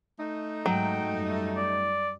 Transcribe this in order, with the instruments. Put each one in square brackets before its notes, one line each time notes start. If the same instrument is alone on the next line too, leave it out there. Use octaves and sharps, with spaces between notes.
[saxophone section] A3 D#4
[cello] G#2 G5 [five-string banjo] F#3
[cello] F#2 G3
[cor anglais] D5